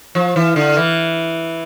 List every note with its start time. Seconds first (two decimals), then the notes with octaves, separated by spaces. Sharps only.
0.15 F3
0.36 E3
0.56 D3
0.77 E3